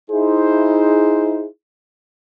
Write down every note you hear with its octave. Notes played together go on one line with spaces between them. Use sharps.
D#4 E4 G#4 C5